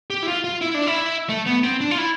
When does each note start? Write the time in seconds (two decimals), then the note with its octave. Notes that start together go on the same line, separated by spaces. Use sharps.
0.10 G4
0.23 E4
0.28 F4
0.44 F4
0.61 E4
0.74 D4
0.87 E4
1.29 A3
1.46 B3
1.64 C4
1.81 D4
1.91 F4
1.98 E4